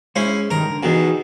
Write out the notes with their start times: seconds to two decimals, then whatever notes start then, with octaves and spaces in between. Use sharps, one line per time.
0.16 G#3 C#4 E4 C5
0.51 G2 D#3 G3 A#4
0.70 D3
0.83 E2 B2 D#4 G4 G#4